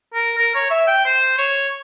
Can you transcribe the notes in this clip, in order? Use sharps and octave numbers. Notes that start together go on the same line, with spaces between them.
A#4
A#4
C#5
E5
G5
C5
C#5